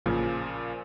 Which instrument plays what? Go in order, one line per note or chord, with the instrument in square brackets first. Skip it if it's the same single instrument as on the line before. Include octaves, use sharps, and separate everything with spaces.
[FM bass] A1 [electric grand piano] A#2 C#3 F3